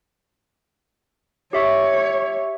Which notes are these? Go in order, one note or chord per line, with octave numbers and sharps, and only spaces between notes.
G4 C#5 E5 C#6